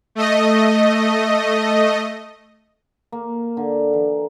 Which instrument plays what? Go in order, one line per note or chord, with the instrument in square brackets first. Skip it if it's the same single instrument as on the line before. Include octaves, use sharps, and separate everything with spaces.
[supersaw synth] A3 D#5
[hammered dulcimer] A#3
D3
E3